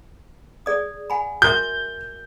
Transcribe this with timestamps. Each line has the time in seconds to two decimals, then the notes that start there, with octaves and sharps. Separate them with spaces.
0.66 G#4 D5 D#6
1.10 F#5 G#5 B5
1.42 F#4 A#4 E5 G6